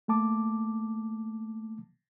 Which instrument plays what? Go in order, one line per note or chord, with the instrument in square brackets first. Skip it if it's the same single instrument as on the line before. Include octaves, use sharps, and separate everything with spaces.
[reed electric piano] A3 A#3 A5 D6